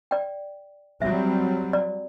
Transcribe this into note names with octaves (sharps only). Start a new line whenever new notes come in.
D5 G5
F#3 G3 C4 E5
D5